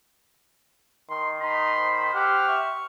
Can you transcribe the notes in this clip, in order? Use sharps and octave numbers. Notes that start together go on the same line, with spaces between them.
D#3 C6
D#4 B5 C6
C5
G4 F#5 F6
E5 C#6